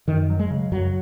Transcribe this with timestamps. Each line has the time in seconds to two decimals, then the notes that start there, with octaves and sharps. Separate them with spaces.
0.08 F#2 D#3
0.30 F#3
0.39 G#3
0.51 C#3
0.72 F#2 F#3